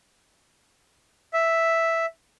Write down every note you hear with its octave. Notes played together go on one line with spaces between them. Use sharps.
E5